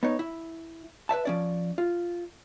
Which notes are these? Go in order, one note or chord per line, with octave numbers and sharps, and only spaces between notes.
B3 D#4 C#5
E4
B4 C#5 E5 A5
F3 C#4 D5
F4